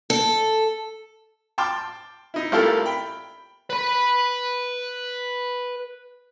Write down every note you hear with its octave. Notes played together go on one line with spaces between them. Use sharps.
A4
G5 A5 C6 D6 F6
D#4 E4
A1 E4 F4 G4 A4 A#4
G5 B5
B4 B5